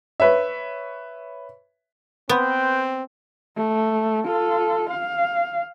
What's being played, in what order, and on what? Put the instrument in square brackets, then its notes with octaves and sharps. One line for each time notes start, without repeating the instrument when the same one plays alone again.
[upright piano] B4 C#5 E5
[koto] B3 [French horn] C4 [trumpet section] B4 G5 C6
[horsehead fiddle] A3
F4 A4
F5